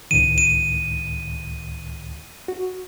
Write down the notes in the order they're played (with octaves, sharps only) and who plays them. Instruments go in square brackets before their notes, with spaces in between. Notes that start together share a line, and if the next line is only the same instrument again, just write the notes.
[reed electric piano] C#2 A2 D#3 [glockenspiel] D#7
[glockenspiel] D#7
[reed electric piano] F#4